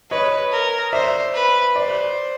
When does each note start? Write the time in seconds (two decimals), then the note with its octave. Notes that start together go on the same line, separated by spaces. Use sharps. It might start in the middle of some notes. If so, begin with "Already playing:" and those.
0.11 B4 C#5 D#5
0.52 A#4
0.93 C5 D5 E5
1.34 B4
1.76 C5 D5